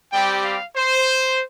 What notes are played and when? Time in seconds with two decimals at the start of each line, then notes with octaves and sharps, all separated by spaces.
0.12 G3 C4 G4 G5
0.44 F5
0.76 C5